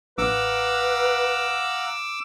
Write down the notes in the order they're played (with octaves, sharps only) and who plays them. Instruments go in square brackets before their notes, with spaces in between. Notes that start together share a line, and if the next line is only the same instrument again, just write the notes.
[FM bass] A1 [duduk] B4 [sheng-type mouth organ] F5 F#5 A#5 [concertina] D6 E6